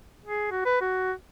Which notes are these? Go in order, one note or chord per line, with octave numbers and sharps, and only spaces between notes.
G#4
F#4
B4
F#4